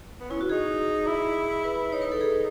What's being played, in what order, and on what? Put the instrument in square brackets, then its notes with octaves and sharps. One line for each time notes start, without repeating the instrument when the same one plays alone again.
[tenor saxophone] B3
[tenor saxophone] C#4 [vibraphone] E4
[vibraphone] F#4
[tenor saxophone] D#4 [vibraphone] G#4
[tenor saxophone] E4
[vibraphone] B4
[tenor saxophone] D#4 [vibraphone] C#5
[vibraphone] B4
A4
G#4